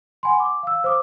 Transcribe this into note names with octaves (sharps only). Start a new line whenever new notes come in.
F#5 G#5 B5 C6
D6
F5 E6
C5 D6 D#6